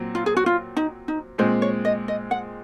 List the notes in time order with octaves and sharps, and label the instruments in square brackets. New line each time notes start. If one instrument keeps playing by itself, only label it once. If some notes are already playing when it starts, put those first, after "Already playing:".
Already playing: [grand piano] A#2 F#3 C4
[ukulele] F4
G#4
F#4
F4
D#4
D#4
[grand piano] A#2 G#3 C4 [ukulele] C5
[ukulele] C#5
D#5
D#5
F#5